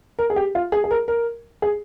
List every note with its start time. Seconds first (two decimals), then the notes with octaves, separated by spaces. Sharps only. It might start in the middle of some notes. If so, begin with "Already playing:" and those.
0.19 A#4
0.30 G#4
0.36 G4
0.55 F4
0.72 G#4
0.84 G#4
0.91 A#4
1.08 A#4
1.62 G#4